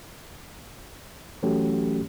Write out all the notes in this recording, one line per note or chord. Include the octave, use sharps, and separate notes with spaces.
E3 F#3 A3 C#4 F#4 G4